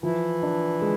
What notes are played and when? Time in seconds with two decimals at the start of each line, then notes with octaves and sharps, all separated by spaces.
0.02 E3 F3 E4
0.43 D4
0.81 G#3